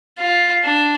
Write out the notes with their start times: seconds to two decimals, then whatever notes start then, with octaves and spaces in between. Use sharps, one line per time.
0.19 F4
0.64 D4